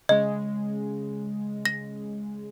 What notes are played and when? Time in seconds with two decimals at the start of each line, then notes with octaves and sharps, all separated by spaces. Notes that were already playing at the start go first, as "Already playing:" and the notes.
0.09 C#3 G#3 D#5
1.65 A#6